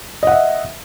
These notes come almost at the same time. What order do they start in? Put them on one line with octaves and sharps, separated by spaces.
D#5 F#5 E5